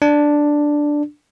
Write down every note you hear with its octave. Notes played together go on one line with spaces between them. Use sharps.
D4